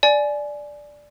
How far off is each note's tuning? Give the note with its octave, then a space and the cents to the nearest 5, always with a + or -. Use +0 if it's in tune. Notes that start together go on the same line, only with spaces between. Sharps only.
D5 +0 G#5 +20